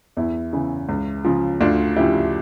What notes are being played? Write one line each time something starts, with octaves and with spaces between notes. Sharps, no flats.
E2 E4
C#3 E3
C#2
C#3 F3
D2 D4 F4
C#3 F3 E4 G4